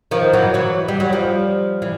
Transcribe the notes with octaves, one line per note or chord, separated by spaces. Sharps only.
D#3 F3
E3 F#3
E3 F#3
G3
F#3
F3 G3
E3